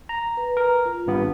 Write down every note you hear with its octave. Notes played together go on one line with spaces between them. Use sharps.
A#5
B4
A#4
F4
G#1 G2 B3